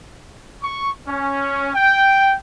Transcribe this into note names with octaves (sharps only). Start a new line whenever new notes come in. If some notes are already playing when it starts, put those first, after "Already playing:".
C#6
C#4
G5